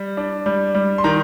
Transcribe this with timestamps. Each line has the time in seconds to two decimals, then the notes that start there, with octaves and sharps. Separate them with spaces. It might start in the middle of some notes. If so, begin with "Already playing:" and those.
Already playing: G3
0.17 D4
0.46 G3
0.75 G3
0.98 C6
1.04 D#3 A#5